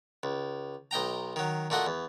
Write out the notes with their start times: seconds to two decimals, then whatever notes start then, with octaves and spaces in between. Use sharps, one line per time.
0.23 C#2
0.91 B1 D#5 G5 A#5
1.36 D#3 F#3
1.70 A#2 A3 F#4 D#5
1.86 E2